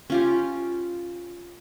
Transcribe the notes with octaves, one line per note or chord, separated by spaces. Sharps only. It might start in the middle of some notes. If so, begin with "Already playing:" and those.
C#4 F4 G4